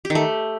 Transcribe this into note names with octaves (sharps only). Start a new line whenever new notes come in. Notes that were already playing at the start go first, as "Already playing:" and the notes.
G4
D#3
A3